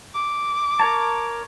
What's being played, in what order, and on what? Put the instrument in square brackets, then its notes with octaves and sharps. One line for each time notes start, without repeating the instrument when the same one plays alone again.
[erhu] D6
[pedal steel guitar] A#4 C#5 A5